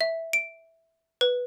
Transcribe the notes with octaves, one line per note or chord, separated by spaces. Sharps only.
E5
D7
B4